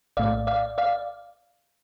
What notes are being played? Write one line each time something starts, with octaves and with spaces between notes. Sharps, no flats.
A#1 A2 A3 D5 F5
D5 F5
D5 F5